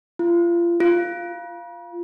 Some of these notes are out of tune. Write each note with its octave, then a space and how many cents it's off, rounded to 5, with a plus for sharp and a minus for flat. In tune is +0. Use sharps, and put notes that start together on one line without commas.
F4 -30
F4 -5